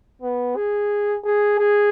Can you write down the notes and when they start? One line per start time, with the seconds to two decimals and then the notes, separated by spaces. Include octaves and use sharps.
0.22 B3
0.56 G#4
1.25 G#4
1.59 G#4